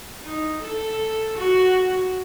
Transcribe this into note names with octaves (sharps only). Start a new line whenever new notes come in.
D#4
A4
F#4